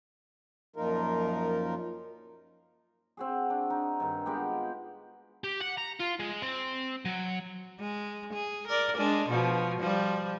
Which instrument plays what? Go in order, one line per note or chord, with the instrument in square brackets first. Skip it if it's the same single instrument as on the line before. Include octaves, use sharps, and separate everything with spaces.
[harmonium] F#2 A#2 F3 D#4 F4 A#4
[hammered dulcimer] C4 F#4 G#4
D4
D#4
G2 D#3
G#3 B3 F4 G4
[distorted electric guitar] G4
F#5
A#5
F4
G#3
C4
F#3
[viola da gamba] G#3
G#4
A#4 D5
G#3 D4
B2 F3
F3 G3